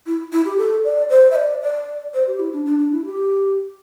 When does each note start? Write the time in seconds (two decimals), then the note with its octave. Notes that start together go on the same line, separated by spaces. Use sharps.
0.06 E4
0.33 E4
0.46 G4
0.58 A4
0.84 D5
1.10 C5
1.31 E5
1.36 D5
1.62 D5
2.14 C5
2.27 G4
2.39 E4
2.53 D4
2.65 D4
2.79 D4
2.92 E4
3.05 G4